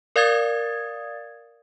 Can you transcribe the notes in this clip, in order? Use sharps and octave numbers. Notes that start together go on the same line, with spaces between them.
A#4 D5 F5 D#6 G#6 A6